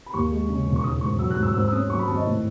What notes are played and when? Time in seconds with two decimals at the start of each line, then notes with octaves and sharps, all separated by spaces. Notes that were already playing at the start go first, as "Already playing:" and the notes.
0.06 B5
0.14 D#2 C#6
0.31 G#3
0.49 C#3
0.66 E1
0.76 C#6
0.84 D#3 D#6
1.01 G#2 C#6
1.19 F#3 E6
1.30 F#6
1.36 G#2
1.43 E6
1.54 G#2 E6
1.65 E6
1.72 C#4 D#6
1.90 F#3 C#6
1.99 B5
2.08 G#1 A5
2.16 D#5
2.26 A2